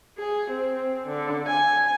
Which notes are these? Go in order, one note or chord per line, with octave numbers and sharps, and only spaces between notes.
G#4
C4
D3
G#5